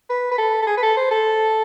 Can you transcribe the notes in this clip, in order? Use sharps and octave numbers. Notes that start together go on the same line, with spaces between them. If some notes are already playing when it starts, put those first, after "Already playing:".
B4
B4
A4
A4
G#4
B4
A4
C5
A4